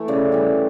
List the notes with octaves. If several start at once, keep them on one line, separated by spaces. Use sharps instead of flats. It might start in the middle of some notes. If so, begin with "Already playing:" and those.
Already playing: E3 A3
C#3 D5
E3 G3